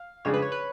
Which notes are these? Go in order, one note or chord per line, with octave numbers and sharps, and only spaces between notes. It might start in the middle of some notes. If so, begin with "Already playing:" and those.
Already playing: F5
F2 C#3 G#3 D4 G#4 C#5
B4
C#5
B4